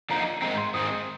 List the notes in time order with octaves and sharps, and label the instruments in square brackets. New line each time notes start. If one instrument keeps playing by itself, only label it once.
[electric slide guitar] D3 F3 A#3 D#4 [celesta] A#5
[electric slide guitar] G#2 D#3 G#3 C4 [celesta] A#5
[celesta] C6
[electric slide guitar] G#2 D#3 G#3 C4 [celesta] D#6